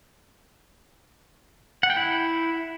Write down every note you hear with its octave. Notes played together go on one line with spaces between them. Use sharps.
F#5
G5
E4